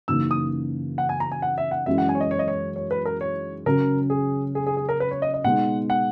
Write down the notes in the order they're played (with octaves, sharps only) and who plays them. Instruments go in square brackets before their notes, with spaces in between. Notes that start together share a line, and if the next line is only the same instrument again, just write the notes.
[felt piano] F#2 C#3 E3 A#3 D#4 [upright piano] E6
[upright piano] D#6
F#5
G#5
A#5
G#5
F#5
E5
F#5
[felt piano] F#2 E3 G#3 C#4 E4 [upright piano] E5
[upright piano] F#5
G#5
C#5
D#5
C#5
D#5
C#5
C#5
B4
A#4
C#5
[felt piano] C#3 F#3 C#4 [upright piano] A#4
[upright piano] G#4
G#4
G#4
G#4
A#4
B4
C#5
D#5
D#5
[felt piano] B2 G#3 B3 D#4 [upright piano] F#5
[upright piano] F#5